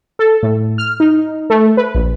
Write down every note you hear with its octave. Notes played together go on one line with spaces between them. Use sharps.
A4
A2
F6
D#4
A3
B4
A#1